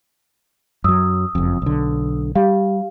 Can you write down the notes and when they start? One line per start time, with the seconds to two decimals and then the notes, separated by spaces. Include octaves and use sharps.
0.84 F#2 F#3 D#6 E6
1.35 F#1 F2
1.62 B1 D3
2.35 G3 G4 F5